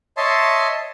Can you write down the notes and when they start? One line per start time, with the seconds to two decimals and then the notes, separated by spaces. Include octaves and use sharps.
0.17 C#5 D#5 E5 A5 C6